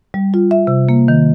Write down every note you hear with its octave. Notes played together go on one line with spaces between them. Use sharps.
G3
F4
E5
C3
A#3
D#3